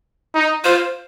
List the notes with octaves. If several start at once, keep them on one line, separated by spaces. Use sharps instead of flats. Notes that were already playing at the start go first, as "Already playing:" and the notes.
D#4
F4 C5